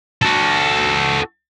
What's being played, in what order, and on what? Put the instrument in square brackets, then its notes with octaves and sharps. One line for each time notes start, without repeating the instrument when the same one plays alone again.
[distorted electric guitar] F#4 A4